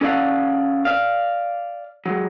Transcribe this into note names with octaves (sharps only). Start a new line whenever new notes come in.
C#4 A4 D5 F5 F#5
D5 F5
F#3 G#3